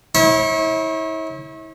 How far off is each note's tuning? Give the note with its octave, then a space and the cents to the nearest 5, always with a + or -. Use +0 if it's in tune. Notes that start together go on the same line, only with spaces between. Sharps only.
E4 -40 C#5 -30